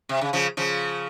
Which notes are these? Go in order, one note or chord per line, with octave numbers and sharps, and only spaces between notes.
C3
C#3
C#3 F3
C#3 F3